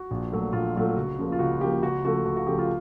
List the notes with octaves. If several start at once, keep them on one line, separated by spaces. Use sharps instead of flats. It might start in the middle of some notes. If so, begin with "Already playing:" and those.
Already playing: F#4
A#1
A#2 F#3 A3
A#1 F4
A#2 F#3 A3 F4
C#2 F#4
C#3 F3 A#3
F4
C#2 F#4
C#3 F3 A#3 G4
C#2 F#4
C#3 F3 A3 F#4
C#2 F#4
F#4
C#3 F3 A3 G4
F4